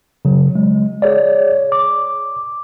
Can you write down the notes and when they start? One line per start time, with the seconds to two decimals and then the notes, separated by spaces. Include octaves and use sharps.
0.25 C#3 F#3
0.56 G#3
1.02 G#4 C#5 D5
1.72 D6